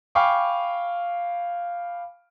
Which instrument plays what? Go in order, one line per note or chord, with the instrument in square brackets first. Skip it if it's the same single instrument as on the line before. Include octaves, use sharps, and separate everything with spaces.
[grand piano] F5 G5 G#5 B5 C#6 D6